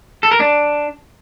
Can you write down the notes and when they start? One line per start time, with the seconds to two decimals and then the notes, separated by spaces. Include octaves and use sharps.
0.23 A4
0.31 A#4
0.40 D4